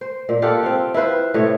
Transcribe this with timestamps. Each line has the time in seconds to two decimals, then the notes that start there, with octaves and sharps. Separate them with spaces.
0.01 C5
0.29 A#2
0.42 F4 G4 A4 F#5
0.63 C4 F4
0.94 E4 F4 B4 C5
1.34 A2 C3 C#5